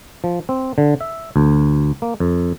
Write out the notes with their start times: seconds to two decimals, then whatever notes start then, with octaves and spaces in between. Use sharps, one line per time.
0.24 F3
0.49 C4
0.78 D3
1.01 E5
1.36 D2
2.02 A#3
2.20 F2